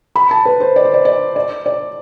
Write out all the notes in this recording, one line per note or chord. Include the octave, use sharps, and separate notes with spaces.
B5
A5
B4
C5
D5
C5
D5
D5
D5
D5